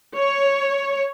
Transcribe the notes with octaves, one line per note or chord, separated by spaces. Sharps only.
C#5